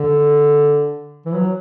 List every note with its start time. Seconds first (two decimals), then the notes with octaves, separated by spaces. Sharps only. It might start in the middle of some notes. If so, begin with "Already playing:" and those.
Already playing: D3
1.26 E3
1.34 F#3